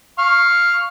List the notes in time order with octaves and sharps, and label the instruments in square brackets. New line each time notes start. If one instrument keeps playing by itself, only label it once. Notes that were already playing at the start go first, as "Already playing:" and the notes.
[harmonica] F5 C#6